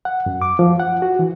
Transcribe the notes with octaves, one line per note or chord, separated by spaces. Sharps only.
F#5
F#2
D6
F3
F#5
F#4
E3